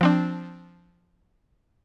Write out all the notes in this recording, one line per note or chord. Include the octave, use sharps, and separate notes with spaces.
F3 C4 D4